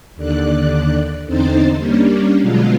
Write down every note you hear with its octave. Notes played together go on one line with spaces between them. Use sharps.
D#2 D3 D5 F#6
E2 D3 C4 D#4 C5 A6
G3 A#3 C#4 D4
B2 D3 F#3 G#3 B3 F4